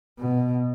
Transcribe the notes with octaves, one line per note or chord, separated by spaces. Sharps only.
B2